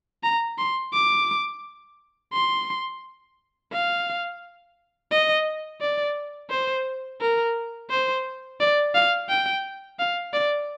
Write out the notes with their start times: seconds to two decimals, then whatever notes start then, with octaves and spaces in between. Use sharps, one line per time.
0.23 A#5
0.58 C6
0.93 D6
2.33 C6
3.72 F5
5.11 D#5
5.81 D5
6.50 C5
7.21 A#4
7.90 C5
8.60 D5
8.94 F5
9.29 G5
9.99 F5
10.33 D5